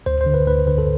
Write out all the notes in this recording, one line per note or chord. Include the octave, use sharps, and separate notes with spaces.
D2 C5
C5
D3
B4
D2 B4
D3 B4
A4